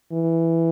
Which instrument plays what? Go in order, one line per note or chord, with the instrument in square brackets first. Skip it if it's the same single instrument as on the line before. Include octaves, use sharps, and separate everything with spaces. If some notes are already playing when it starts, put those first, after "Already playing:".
[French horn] E3